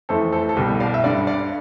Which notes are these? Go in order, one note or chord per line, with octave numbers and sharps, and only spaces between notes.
F2 E3 A3 A4 C5
A4 C5
A4
C2 B2 G3 G4
D5 F5
E5
G2 D3 G3 D5 F5
D5 F5